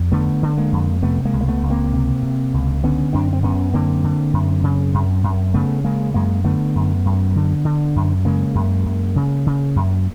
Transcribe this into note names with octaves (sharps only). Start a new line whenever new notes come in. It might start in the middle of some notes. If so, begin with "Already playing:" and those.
Already playing: F2
D3 A3 B3
D3
G#3 A#3
F2
C3 A3 B3
G#3 A#3
C#2
A#3
A3 B3
C#2
A#3 C4
C3
C3
C#2
D3 B3 C#4
F#2 C4 D4
C4
F#2 B3 C#4
D3 A#3 C4
D3
F#2
C#3
F#2
F#2
C#3 A3 B3
C#3 G#3 A#3
F#2 G#3 A#3
D3 A3 B3
F#2
F#2
D3
D3
F#2
C#3 G#3 A#3
F#2
F#2
C#3
C#3
F#2